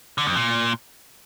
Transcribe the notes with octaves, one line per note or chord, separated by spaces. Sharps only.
D3
F2
A#2